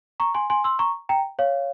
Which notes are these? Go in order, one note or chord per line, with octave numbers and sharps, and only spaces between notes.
A#5 C#6
G#5 C6
G#5 C6
C6 E6
A#5 C#6
G5 A#5
C#5 F5